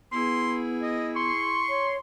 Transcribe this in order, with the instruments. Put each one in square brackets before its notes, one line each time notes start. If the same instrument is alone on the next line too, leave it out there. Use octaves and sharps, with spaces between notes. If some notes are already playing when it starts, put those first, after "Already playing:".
[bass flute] B3 [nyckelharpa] E4 G#4 [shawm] C6
[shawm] D#5
[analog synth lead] C6 [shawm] C#6
[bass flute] C#5